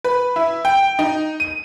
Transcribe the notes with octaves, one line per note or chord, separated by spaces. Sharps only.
B4
E4
G5
D#4
D#7